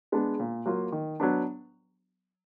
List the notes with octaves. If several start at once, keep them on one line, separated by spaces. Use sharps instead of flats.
G#3 B3 D4
A#2
F#3 A#3 F4
D#3
F#3 B3 D4